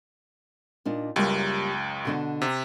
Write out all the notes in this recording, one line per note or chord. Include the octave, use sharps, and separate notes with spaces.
A#2 D4 D#4
C#2 F#2 G3 A#3
B2 D3 D4
C3